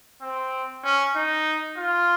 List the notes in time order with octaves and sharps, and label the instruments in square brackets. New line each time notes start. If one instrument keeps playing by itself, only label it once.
[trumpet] C4
C#4
D#4
F4